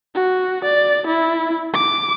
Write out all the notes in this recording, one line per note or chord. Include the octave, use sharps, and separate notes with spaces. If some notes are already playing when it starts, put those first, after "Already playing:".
F#4
D5
E4
D6